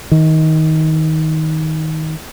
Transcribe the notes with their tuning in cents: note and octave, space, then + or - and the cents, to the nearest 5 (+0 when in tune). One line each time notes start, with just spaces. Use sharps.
D#3 +20